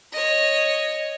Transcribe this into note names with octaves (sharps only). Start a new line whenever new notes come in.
C#5 D#5